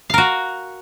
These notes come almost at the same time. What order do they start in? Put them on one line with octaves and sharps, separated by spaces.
F5 A#4 F#4